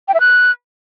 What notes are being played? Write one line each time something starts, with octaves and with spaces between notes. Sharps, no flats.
G5
E5
F#6